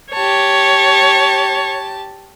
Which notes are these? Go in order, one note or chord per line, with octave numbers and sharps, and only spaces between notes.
G4 C#5 A5